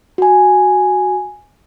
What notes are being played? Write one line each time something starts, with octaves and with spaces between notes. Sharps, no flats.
F#4 G#5